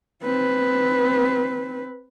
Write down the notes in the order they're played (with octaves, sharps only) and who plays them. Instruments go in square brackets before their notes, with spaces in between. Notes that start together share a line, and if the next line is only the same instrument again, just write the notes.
[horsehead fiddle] C4 B4